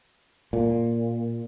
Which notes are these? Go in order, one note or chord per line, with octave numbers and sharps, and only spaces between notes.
A#2